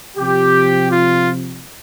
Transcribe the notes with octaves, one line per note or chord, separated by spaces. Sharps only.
C3 F3 G4
F4